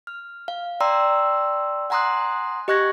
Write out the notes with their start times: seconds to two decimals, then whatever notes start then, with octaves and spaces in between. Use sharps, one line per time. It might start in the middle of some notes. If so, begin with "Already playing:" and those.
0.07 F6
0.48 F5
0.80 D5 G5 A#5 C6 E6
1.90 F#5 G#5 A#5 C6 D#6 F#6
2.68 G4 D#5 C#6 F#6 G#6 A#6